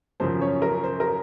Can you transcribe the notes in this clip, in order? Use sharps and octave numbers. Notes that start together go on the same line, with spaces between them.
F#2 C#3 F3 C5
C#4 C#5
A#4
C5
A#4